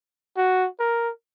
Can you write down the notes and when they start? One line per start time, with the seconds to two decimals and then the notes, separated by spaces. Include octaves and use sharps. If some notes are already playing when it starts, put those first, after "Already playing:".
0.37 F#4
0.80 A#4